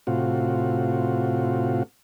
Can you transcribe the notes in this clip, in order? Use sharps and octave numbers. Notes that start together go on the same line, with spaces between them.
A2 C3 F4 F#4